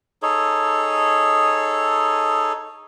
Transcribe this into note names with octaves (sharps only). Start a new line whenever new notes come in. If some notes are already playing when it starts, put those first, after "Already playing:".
D#4 G#4 A4 C#5